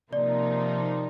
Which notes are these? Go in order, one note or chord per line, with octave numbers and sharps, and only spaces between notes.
C3 F3 A#3 D#4 D5